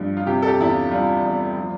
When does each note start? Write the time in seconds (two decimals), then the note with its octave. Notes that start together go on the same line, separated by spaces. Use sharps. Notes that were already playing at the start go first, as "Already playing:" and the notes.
Already playing: G2 F3
0.17 F4
0.27 C3 G4
0.42 A4
0.48 G4
0.59 E2 E4
0.70 F4
0.91 G3 F4
1.23 E2
1.57 F3